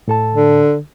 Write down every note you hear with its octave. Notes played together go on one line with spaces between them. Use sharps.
A2 A4 A5
D3